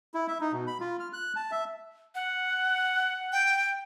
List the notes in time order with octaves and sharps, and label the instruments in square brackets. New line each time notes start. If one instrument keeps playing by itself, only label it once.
[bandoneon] E4
E5
D#4
B2
B5
F4
F6
F#6
A5
E5
[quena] F#5
[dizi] G5